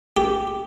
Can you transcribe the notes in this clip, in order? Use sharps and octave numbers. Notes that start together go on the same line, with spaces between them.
G4